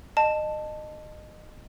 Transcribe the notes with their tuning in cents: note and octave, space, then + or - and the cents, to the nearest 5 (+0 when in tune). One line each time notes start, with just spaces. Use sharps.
D#5 -25 A5 +0